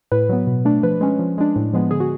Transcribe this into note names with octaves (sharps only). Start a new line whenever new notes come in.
A2 B4
F#3 B3
B2
A3 D4
F3 B4
G#3 C#4
F3
G#3 D4
A2
F3 G#3 B3
D3 G#4
F#4